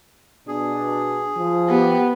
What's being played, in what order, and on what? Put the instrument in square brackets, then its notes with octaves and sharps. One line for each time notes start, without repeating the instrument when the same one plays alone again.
[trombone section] B2 D4 [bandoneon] G#4
[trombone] F3
[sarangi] B3 [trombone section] G4